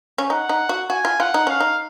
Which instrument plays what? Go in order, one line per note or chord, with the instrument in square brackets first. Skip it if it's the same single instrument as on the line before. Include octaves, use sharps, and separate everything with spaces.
[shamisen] C#4
[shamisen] D#4 [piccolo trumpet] F#5
[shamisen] D#4
F#4
[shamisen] F#4 [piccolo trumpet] G#5
[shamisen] F4
[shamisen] F4 [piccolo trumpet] F#5
[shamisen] D#4
[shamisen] C#4 [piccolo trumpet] F5
[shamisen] D#4